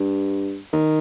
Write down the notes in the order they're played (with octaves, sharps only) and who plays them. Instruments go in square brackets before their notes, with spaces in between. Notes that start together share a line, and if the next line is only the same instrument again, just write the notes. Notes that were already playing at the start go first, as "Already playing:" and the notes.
Already playing: [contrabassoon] G2
D#3